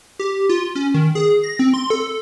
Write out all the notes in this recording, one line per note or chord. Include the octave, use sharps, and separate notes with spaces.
G4
F4
C#4
D#3
G#4
A#6
C4
C6
A4